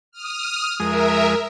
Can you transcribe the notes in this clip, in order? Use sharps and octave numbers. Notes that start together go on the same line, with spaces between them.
D#6 F6
F2 G#3 A#4 E5 D#6